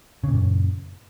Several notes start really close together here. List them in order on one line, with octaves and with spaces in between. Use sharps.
C#3 A#2 F#2